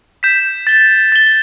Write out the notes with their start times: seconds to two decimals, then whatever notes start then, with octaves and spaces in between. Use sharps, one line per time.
0.23 G6 B6 E7
0.67 A6 G7
1.12 A6 G7